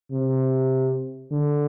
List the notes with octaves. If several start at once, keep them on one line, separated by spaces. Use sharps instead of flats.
C3
D3